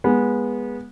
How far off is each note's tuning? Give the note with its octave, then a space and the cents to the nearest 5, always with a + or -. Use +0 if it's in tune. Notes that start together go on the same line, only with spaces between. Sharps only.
G#3 -15 B3 -20